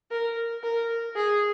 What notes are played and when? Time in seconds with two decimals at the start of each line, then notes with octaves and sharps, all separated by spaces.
0.11 A#4
0.63 A#4
1.16 G#4